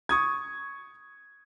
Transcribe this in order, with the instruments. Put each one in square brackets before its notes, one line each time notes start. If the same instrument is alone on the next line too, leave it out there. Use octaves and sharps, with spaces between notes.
[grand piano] C#6 D#6 G#6